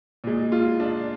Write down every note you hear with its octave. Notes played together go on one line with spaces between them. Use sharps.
A#2 G#3
F4
D4